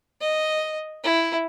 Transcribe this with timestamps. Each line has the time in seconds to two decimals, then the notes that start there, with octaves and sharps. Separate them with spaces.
0.21 D#5
1.04 E4